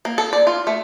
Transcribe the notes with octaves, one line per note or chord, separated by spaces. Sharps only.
A#3
A4
D5
F4
A3